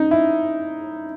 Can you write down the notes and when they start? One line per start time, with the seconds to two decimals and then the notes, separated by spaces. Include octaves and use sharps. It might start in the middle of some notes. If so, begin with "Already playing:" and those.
Already playing: D#4
0.11 E4